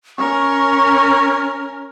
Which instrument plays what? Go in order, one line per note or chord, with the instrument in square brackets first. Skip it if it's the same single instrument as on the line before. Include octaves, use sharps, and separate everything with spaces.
[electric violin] C#4 A#4 [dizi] C#6